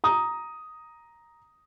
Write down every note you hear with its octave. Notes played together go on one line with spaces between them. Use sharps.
A#5 D#6